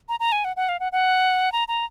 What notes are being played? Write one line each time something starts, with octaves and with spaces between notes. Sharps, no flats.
A#5
A#5
G#5
F#5
F#5
F5
F#5
F#5
A#5
A#5